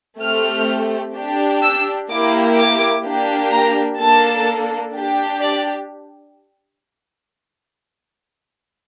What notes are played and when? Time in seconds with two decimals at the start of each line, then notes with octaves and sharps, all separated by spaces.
0.21 A3 C4 G4 F6
1.16 D4 G4
1.63 E6
2.10 A#3 E4 G4 D6
2.57 D6
3.05 A#3 D4 G4
3.52 A#5
3.99 A#3 D4 A4 A5
4.94 D4 G4
5.41 D5